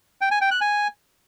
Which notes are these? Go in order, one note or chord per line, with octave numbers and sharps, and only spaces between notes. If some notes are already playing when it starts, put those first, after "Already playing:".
G5
G#5
G5
F#6
G#5